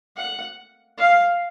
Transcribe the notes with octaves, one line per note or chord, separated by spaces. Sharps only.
F#5
F5